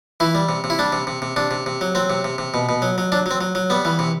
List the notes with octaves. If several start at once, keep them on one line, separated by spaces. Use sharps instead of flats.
E3 E4
G3
C3
C3
E4
G3 D4
C3
C3
C3
C3 D4
C3
C3
F#3
F#3 C4
C3
C3
C3
B2
B2
F#3
F#3
F#3 D4
F#3 C4
F#3
F#3
G3 B3
E3
C3